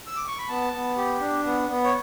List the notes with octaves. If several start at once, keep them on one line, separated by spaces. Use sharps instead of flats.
E6
D6
C#6
B5
B3 A5
B3
G4
D4
B3
B3
C#5